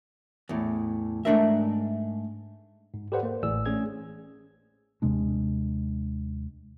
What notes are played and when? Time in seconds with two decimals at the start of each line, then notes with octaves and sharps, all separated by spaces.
0.49 E2 A2
1.25 G#2 A3 D4 A#4 E5
2.94 G#2
3.12 G4 A4 B4 C5 D5 F#5
3.23 A#3 C5
3.43 A1 A2 E3 G#4 D5 E6
3.66 A3 C#4 G#4 G#6
5.02 D#2 C3 G#3 D4